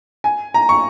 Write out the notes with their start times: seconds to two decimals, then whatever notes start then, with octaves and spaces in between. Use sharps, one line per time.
0.24 G#5
0.54 A#5
0.69 C#6